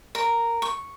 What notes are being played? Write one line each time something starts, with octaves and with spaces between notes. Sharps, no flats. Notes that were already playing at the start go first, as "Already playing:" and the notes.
A#4
C#6